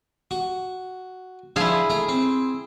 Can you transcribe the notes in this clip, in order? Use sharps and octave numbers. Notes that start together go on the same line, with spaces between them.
F#4
D3 F3 E4 F4 G#4
A3 A#5
C4